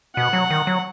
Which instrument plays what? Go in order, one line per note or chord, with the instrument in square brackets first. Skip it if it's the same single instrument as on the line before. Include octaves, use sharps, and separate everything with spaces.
[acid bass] B2 [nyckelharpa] F#5
[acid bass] F#3
D#3
F#3